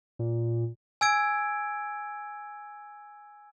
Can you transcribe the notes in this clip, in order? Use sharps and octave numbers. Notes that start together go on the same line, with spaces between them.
A#2
G#5 E6 G#6 D7